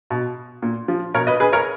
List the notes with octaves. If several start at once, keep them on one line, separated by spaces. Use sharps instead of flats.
B2
A#2
F3
B2 A#4 C#5
B4 D#5
G#4 B4
A#4 C#5